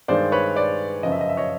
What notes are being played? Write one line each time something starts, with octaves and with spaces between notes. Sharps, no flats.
G2 D#3 G#3 C5 D5
B4 C#5
C5 D5
F#2 C#3 F3 D#5
E5
D#5
E5
C#5 D#5